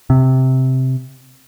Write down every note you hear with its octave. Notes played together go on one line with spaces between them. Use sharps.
C3